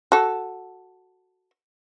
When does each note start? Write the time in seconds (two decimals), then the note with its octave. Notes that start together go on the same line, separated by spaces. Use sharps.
0.12 F#4 A4